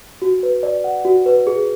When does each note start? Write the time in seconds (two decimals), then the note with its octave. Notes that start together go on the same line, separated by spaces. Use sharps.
0.22 F#4
0.43 B4
0.63 D5
0.84 F#5
1.05 F#4
1.26 B4
1.47 G#4